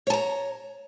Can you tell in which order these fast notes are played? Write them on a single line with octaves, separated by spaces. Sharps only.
C#5 A5 A#5